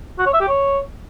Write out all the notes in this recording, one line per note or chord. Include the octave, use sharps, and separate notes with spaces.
F#4
C#5
E5
G4
C#5